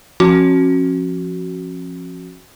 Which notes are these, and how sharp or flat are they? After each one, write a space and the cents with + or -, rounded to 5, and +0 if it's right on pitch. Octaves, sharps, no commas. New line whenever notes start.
F3 +0 C#4 -35 F#4 +0